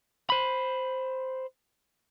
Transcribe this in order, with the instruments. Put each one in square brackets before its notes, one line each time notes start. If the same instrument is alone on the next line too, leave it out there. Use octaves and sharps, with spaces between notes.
[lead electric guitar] C5 B5